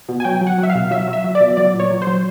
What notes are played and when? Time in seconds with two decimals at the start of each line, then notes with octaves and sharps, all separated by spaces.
0.09 B2
0.20 G#5
0.25 F#3 G5
0.41 F#3
0.47 F#5
0.58 F#3
0.63 E5
0.70 F5
0.75 B2
0.91 F#3 E5
1.08 F#3
1.13 E5
1.24 F#3
1.35 D5
1.41 B2
1.57 F#3 D5
1.74 A#2
1.80 C#5
1.91 F#3
2.02 C5
2.07 F#3